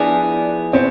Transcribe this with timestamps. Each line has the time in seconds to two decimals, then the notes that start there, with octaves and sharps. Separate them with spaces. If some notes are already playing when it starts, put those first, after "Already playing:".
Already playing: F3 B3 D4 E4 G#4
0.73 B2 B3 C4 E4